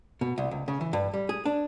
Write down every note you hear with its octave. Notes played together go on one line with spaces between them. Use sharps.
B2
C2
C#2
C#3
E3
G2
G3
G#4
D4